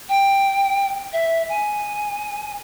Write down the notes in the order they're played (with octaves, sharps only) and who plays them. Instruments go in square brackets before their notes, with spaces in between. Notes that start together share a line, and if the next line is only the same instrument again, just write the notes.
[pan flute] G5
E5
G#5